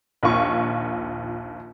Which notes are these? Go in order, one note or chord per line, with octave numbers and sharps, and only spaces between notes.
A#1 D#2 F4 C#6